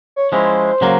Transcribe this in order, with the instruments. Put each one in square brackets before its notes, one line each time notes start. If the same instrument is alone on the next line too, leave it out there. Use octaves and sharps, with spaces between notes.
[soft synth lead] C#5
[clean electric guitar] F3 G#3 C#4 E4 [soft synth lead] C5
[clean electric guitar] C#3 F#3 A#3